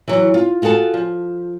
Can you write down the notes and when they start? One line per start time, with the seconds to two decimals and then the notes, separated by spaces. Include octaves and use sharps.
0.08 E3 F#3
0.34 F4
0.62 F4 F#4 G#4 A4 A5
0.94 F3